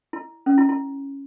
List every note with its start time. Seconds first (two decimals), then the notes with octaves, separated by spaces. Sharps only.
0.13 E4
0.46 C#4
0.58 E4
0.69 E4